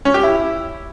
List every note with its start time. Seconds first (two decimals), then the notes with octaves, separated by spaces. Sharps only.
0.05 C#4
0.14 G4
0.23 E4